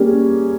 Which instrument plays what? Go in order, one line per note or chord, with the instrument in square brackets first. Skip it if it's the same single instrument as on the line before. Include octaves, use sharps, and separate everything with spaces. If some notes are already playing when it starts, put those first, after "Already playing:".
Already playing: [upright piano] G3 A#3 C#4 G#4